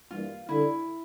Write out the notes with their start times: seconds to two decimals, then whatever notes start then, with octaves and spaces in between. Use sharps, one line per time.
0.10 G2 E3 G3 A#3 F4
0.49 D3 G3 D4 E4 A4